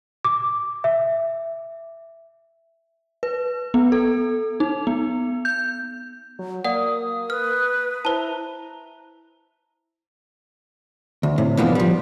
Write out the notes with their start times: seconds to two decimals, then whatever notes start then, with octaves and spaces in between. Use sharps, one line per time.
0.25 D6
0.84 E5
3.23 B4
3.74 B3
3.92 A4
4.60 D#4
4.87 B3
5.45 G6
6.39 F#3
6.65 A#3 D5 F#5 D#6
7.30 B4 F6
8.05 E4 C5 A5 A#5
11.23 D2
11.38 A2 C3
11.57 B2 D3 E3 F3 A#3 B3
11.75 F3 G3